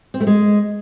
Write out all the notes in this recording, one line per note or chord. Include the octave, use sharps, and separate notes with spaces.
C4
A3
G#3